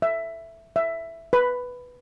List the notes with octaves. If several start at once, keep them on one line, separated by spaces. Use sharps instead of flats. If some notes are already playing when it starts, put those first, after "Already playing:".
E5
E5
B4